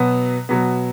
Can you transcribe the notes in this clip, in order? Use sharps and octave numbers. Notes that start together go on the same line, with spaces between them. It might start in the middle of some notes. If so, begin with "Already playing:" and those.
Already playing: B2 F#3 B3
B2 F#3 B3